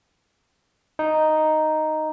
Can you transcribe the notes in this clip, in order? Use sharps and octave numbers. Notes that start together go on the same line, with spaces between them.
D#4